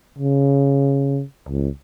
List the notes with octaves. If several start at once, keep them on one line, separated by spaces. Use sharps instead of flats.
C#3
C#2